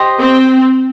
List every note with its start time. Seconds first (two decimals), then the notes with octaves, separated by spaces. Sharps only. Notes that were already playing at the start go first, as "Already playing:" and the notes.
Already playing: G4 C5 D#5 C6
0.18 C4